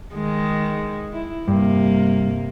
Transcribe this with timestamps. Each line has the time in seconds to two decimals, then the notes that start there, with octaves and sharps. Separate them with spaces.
0.14 D#3 G#3
1.13 E4
1.48 G2 C3 A#3